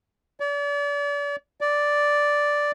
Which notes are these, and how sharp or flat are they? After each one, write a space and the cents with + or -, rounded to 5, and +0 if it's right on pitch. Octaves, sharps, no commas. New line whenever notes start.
D5 -40
D5 -5